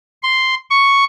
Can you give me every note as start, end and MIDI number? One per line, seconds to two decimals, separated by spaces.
0.23 0.55 84
0.70 1.04 85